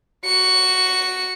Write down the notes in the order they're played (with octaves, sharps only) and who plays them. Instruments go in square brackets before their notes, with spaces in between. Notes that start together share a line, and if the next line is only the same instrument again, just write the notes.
[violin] F#4 C#7